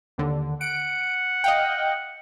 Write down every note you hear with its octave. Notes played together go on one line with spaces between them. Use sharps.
D#2 D3
F#5 D7
D#5 F5 G5